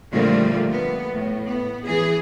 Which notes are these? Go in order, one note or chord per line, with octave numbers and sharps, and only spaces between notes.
A#2 D3 F3 G3 A3 A#3
B3
A2
B3
E3 G#4